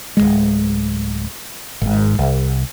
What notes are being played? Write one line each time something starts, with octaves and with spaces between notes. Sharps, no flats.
D1 B1 G#3
G#1 G#2
C2